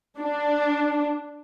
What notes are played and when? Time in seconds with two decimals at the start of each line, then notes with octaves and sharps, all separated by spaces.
0.19 D4